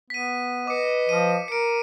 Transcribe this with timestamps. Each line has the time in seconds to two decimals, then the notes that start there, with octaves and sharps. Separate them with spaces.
0.10 B3 B6 D#7
0.67 B4 D#5 D6 C#7
1.09 F3 D#7
1.48 A#4 C#7 D7